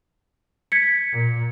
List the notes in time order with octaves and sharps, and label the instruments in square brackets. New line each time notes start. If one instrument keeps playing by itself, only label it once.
[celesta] G#6 B6 C#7
[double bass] A#2